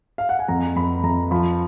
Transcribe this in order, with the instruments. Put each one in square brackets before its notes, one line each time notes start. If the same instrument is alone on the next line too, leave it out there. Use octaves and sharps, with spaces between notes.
[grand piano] F5
F#5
G#5
F2 A#5
F2 B5
F2 A#5
F3 B5